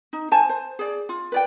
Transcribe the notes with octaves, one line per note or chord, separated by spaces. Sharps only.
D#4
C5 G#5 A5
C5
G#4 D5
F4
B4 D5 G5